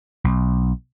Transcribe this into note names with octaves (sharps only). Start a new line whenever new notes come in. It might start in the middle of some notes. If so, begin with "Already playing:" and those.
B1